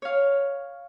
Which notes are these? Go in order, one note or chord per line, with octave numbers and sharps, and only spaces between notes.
C#5 F5